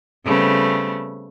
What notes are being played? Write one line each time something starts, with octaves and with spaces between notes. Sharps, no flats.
C#3 G3 A3 B3 C4